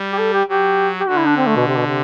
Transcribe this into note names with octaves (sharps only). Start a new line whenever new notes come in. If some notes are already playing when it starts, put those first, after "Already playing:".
Already playing: G3
G4
A4
G4
F#3 G4
G4
D3 F#4
E4
D4
C4
A3
B2
C3
B2
C3